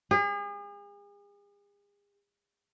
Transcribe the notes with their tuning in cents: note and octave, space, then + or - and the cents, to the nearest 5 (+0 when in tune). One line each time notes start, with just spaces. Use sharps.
G#4 -40